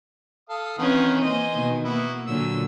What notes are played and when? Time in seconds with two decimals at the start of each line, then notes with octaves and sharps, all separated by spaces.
0.49 A4 F5 D#6
0.78 D#3 E3 C4 C#4 B4 F#5
1.22 A#3 C5 D#5 G#5
1.54 B2 D#3
1.84 A#3 B3 E4 F#4
2.27 A#2 D3 F#3 E6